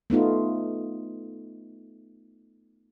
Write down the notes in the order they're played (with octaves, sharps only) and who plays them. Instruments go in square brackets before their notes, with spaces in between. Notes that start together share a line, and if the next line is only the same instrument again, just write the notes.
[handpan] A3 B3 D#4 F4